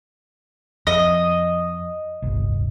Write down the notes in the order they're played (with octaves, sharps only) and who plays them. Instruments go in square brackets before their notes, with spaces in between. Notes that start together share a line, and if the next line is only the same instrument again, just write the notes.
[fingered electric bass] F2 [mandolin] D#5
[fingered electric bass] D1 G1 C2